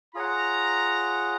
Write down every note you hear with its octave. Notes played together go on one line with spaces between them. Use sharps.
F4 G#4 C#5 F#5 A#5